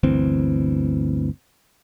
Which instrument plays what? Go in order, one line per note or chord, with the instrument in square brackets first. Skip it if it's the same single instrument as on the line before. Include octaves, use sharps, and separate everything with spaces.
[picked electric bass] G1 D2 E3 C4